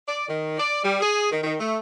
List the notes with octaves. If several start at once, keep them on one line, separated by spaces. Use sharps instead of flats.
D5
D#3
D5
G3
G#4
D#3
D#3
A3